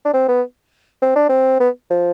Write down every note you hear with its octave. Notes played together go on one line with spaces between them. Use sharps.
D4
C4
B3
C4
D4
C4
B3
F3